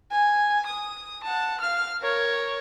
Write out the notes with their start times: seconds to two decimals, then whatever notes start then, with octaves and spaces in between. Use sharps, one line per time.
0.11 G#5
0.66 D#6
1.23 F#5 A5
1.60 F5 F6
2.02 A#4 C#5